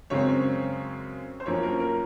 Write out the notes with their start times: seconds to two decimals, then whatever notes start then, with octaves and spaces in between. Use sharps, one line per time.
0.10 F#2 C#3 G#3 C4 C#5
1.40 C5
1.46 F#2 F3 A#3 C#4 C#5
1.63 A#4
1.80 A#4